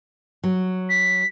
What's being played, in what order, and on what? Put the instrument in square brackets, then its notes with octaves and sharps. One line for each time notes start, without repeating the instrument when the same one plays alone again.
[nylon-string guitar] F#3
[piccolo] B6